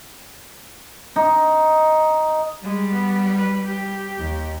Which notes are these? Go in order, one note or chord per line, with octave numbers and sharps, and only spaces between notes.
D#4
G3 G#3
B3
B4
G4
D#2